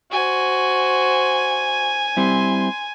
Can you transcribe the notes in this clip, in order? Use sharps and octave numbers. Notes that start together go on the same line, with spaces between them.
F#4 C5 G#5
G3 C4 E4 C6